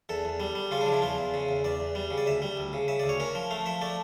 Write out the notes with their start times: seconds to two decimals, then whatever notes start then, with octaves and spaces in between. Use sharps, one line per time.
0.09 E2 A4
0.25 E2
0.40 G3
0.55 G3
0.71 C#3 F4
0.81 D4
0.86 F3
0.92 E4
1.02 E2 F4
1.18 E2
1.34 C#3
1.49 E2
1.64 E2 D5
1.80 E2
1.95 G3
2.10 C#3
2.17 D5
2.26 D2 E5
2.42 G3
2.57 D2
2.73 C#3
2.88 C#3 E5
2.99 D2 D5
3.09 C#5
3.20 C#4 A#4
3.35 F3
3.51 A3 F5
3.66 F3 E5
3.81 A3 D5